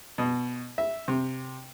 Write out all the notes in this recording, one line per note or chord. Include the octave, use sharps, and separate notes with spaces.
B2
E5
C3